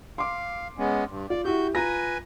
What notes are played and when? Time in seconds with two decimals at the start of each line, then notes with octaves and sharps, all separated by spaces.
0.18 F5 C6 D6
0.78 G#3 B3 C#4
1.07 G2
1.30 F4 D5
1.45 E4 F#4 G4 G6
1.75 F4 B4 G#5 A#5 A#6